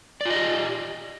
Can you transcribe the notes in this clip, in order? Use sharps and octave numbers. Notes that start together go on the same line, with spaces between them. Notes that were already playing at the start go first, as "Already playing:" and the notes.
F4 G4 D5 D#5